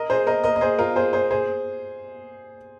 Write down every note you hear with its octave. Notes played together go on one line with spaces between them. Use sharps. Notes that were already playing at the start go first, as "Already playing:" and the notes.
Already playing: A#4 D#5
G#4 C5
A#4 D#5
A#4 D#5
D#5
G#4 C5
F4 A#4
G#4 C5
G#4 C5
G#4 C5